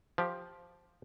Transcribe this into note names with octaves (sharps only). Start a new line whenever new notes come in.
F3 G4